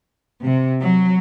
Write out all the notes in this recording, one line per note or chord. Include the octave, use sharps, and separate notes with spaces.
C3
F#3